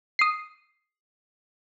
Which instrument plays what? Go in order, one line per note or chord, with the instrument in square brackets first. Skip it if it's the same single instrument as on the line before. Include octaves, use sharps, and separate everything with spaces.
[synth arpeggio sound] D#6 C7